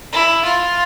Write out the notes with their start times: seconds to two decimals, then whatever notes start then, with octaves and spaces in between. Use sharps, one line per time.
0.13 E4
0.45 F4